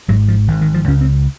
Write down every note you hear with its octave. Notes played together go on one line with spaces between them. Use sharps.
G#1 G#2 F#3
F3
G#1 G#2 D#3
D#3
F3
C#2 C#3 C#4
C4